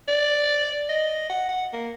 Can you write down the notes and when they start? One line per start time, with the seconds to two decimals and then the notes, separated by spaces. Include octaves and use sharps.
0.08 D5
0.89 D#5
1.29 F#5
1.49 F#5
1.73 A#3